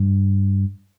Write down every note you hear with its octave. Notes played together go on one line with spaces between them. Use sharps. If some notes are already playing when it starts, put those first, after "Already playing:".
Already playing: G2